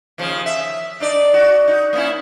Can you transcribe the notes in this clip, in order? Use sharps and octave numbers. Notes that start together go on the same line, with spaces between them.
D#2 C#3 F3
E5
D4 D#4 D5
F#4
D#4
A#3 C#4 E4